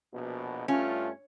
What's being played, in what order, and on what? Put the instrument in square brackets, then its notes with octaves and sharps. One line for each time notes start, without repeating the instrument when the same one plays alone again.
[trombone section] A#1 B2
[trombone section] G2 A3 F4 [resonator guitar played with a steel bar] C#4